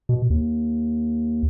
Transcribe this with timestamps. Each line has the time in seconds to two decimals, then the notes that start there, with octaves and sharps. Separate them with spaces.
0.09 B2
0.30 D#2